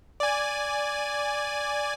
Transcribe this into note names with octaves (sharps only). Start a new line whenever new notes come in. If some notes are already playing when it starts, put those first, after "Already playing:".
D5 G#5